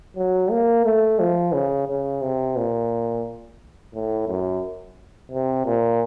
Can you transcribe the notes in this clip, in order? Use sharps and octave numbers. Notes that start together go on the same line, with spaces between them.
F#3
A#3
A3
F3
C#3
C#3
C3
A#2
A2
F#2
C3
A#2